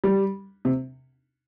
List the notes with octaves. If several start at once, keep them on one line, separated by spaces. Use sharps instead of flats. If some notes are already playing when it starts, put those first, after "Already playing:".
G3
C3